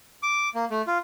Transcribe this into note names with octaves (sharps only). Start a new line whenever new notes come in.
D6
A#3
A3
F4